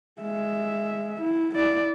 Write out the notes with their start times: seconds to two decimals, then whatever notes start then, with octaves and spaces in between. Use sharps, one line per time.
0.21 G#3 E5
1.21 E4
1.56 E4 D5